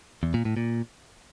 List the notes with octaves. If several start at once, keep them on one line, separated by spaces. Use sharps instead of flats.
E2
A#2
A2
A#2